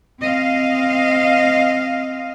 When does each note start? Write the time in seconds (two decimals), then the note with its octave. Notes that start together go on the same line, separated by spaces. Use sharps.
0.20 C4 D#5 F5